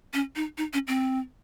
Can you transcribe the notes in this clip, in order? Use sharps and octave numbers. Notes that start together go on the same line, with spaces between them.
C#4
D#4
D#4
C#4
C4